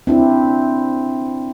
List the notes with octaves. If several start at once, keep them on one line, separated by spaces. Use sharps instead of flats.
C4 D4 E4